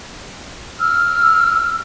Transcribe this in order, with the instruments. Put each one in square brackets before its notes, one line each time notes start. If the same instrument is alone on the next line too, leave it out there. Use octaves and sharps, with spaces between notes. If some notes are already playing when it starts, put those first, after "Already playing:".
[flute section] E6 F6